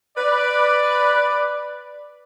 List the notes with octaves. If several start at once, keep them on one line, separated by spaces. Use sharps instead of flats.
B4 D5